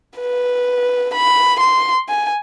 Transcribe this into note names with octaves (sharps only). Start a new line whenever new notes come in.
B4
B5
C6
G#5